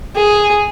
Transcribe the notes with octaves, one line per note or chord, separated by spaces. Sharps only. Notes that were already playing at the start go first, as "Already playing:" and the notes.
G#4